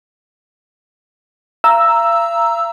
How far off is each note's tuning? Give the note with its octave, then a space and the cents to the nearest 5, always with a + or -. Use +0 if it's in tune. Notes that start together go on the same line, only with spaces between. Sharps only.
F5 -45 A#5 +0 E6 +0